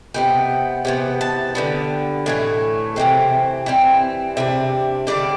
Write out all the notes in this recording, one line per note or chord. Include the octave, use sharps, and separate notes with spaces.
C3 G3 B3 G5
C3 E3 B3
A5
D3 G3 B3
A2 E3 A3
C3 E3 G3 C4
E3 G3 C4
C3 G3 D4 E5
D3 G3 D4 D5